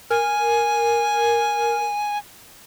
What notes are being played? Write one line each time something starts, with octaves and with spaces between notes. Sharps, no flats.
A#4 G#5